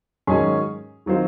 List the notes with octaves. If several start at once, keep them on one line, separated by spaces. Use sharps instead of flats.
G#2 D#3 F#3 C#4 G#4
D#3 F#3 C4 F4 C5